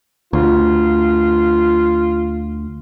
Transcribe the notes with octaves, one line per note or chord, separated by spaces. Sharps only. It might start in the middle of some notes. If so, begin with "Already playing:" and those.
D2 F4